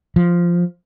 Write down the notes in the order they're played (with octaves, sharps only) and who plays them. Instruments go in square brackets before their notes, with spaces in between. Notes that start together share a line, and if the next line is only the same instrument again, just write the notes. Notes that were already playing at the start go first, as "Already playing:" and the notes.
[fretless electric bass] F3